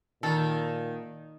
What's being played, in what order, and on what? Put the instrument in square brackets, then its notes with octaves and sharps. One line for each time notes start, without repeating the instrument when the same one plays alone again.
[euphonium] A#2 [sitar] D#3 [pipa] A4